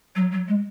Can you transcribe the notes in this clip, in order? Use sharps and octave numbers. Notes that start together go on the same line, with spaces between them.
F#3
F#3
G#3